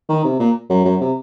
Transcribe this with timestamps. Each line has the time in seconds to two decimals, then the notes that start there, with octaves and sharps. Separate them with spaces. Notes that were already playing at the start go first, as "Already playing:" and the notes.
0.09 D#3
0.24 C3
0.39 A#2
0.70 F#2
0.85 F#2
1.01 C3